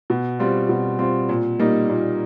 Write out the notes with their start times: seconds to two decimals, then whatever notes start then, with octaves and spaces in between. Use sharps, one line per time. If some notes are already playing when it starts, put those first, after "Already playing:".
0.10 B2
0.39 G3 C4 F4
0.69 B2
0.99 G3 C4 F4
1.29 A#2
1.59 G3 A#3 D#4
1.89 A#2